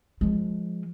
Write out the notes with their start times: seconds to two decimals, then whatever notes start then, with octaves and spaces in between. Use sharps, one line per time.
0.21 F3 G#3